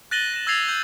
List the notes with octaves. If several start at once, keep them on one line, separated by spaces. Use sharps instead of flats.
F#6 A6 A#6 D#7 F#7 G7
A#6 E7
E6 G#6 A6 C7 F7
E6 G6 F#7